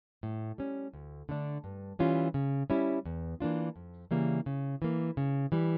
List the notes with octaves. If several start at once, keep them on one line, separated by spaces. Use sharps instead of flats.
A2
G3 C#4
D2
D3 A3 D4
G2
E3 G3 C#4 F4
C#3
G3 C#4 E4
E2
E3 A#3 D4 F4
F2
C#3 E3 G3 A#3
C#3
E3 A#3
C#3
E3 G3